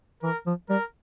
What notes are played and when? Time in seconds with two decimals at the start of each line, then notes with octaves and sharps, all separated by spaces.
0.23 E3 A#4
0.46 F3
0.69 G3 A#4